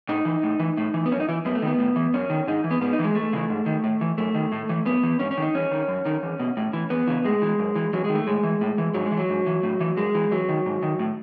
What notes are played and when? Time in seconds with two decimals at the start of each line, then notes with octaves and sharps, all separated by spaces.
0.09 A2 D#4
0.25 E3
0.43 A2
0.59 E3
0.77 A2
0.94 E3
1.06 B3
1.11 F#2 C#4
1.20 D#4
1.29 E3 E4
1.45 F#2 B3
1.55 A3
1.62 D#3 B3
1.79 A2
1.96 E3
2.14 F#2 C#4
2.30 D#3
2.47 G#2 D#4
2.64 E3
2.71 B3
2.81 G#2 B3
2.93 D#4
2.99 E3 G#3
3.15 E2 A3
3.33 C#3 E3
3.50 G#2
3.66 D#3
3.84 A2
4.01 E3
4.18 F#2 A3
4.35 D#3
4.52 A2
4.69 E3
4.85 F#2 B3
5.03 E3
5.19 G#2 C#4
5.31 C#4
5.37 D#3 D#4
5.54 E2 C#4
5.71 D#3
5.88 F#2
6.06 D#3
6.23 E2
6.39 B2
6.57 A2
6.73 E3
6.90 E2 B3
7.07 C#3 E3
7.25 A2 G#3
7.42 E3
7.59 F#2
7.76 E3
7.93 E2 F#3
8.04 D#3 G#3
8.15 A3
8.27 A2 G#3
8.43 E3
8.61 A2
8.78 E3
8.94 G#2 F#3
9.06 G#3
9.11 E3
9.18 F#3
9.30 G#2
9.47 E3
9.63 A2
9.80 E3
9.97 F#2 G#3
10.15 E3
10.31 E2 F#3
10.49 D#3
10.66 G#2
10.83 D#3
10.99 A2